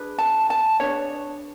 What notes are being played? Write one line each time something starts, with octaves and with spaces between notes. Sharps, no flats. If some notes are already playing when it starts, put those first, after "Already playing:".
Already playing: D4 G#4 B4
A5
A5
D4 G#4 B4 C#5